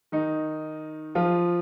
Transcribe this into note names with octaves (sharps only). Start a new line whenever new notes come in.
D#3 D#4
F3 F4